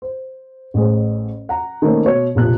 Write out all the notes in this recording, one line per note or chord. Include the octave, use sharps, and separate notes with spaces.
C5
A1 A2 G#4 C5
F#5 A#5
D#3 A3 A#3 C4 C#4
B2 C#5
F1 A#1 C3 F3 F#6